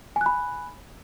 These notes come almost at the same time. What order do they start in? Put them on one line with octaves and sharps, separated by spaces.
G#5 F#6 B5